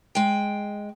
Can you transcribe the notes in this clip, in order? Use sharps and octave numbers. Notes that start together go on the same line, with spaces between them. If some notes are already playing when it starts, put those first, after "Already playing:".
G#3 G5